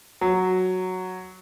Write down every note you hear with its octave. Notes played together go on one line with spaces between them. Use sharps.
F#3